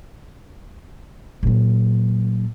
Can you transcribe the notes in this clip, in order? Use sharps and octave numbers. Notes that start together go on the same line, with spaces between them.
A#2 F#3